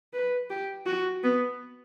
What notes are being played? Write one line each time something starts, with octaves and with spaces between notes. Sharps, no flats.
B4
G4
F#4
B3